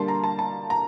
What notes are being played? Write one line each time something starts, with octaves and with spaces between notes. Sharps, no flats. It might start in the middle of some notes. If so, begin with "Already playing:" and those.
Already playing: D3 G3 A#3 A5 C6
A#5
A5
A5
A#5